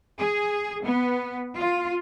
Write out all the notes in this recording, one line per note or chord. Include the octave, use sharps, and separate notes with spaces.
G#4
B3
F4